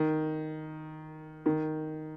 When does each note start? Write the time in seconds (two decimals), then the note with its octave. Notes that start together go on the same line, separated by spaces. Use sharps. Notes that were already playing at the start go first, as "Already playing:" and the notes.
Already playing: D#3
1.46 D#3